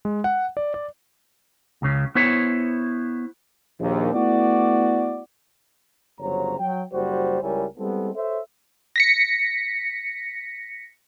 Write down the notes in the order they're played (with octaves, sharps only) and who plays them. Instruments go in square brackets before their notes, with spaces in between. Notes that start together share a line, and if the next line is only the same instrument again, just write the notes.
[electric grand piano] G#3
F#5
D5
D5
[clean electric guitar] C#2 C#3
B3 E4 C5 C#5
[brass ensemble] A#1 D#2
A3 B3 E4 F#4 D5
G1 C#3 F#3 C5 C#5 A#5
F#3 G5
F#1 G3 F#4 C5
C#2 G3 E4 A#4 C#5 G#5
G3 G#3 B3 C4 E4 A4
A4 C5 C#5 E5
[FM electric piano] A#6 B6 C#7